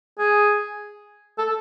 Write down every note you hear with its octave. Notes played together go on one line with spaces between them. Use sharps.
G#4
A4